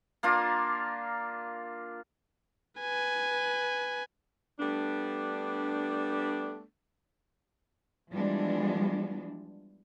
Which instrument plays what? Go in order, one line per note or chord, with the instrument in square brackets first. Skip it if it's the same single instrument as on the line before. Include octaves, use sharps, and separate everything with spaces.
[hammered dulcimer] A#3 D4 F4 A#4
[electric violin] B4 G#5
[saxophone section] G3 A3 B3 D4
[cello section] E3 F3 G3 G#3 B3 D4